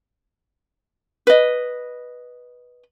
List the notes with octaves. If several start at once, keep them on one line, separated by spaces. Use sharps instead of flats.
B4 D#5